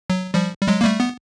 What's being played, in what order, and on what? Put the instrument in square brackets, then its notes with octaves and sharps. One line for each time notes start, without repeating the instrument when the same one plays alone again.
[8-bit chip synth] F#3
F3 G3
G3
F#3 G#3
A#3
G3 A3
B3